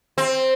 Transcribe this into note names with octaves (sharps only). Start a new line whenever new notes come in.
C4